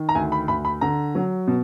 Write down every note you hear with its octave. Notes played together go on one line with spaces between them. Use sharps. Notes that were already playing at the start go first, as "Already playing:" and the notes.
Already playing: D#3
A#5
D2 G#5
B5
D2 B5
B5
D3 A#5
F#3
B2